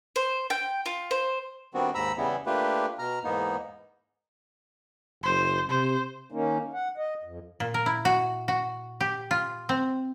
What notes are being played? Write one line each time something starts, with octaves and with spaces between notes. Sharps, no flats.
C5
G5
F4
C5
D#3 G3 B3 C4 D4 F#4
D#2 G#2 A#5 B5 E6
E2 C#3 E3 G3 B3 E4
A3 A#3 D4 F4 G4 B4
B2 A#5 F6
E2 G#2 A#3 B3 D#4
F#1 C5
C3 C5
D#3 A#3 C#4 D#4
F#5
D#5
F2
A#2
A#4
E4
F#4
F#4
G4
F4
C4